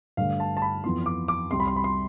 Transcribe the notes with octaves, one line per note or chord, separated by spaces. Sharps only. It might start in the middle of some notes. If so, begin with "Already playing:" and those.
G2 D3 A3 F5
A5
A5
B5
F2 E3 B3 C6
D6
D6
C2 C3 G3 C6
B5
C6
B5
C6